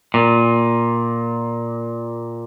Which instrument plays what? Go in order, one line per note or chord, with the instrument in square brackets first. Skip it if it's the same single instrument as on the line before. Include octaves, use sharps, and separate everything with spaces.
[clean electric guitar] A#2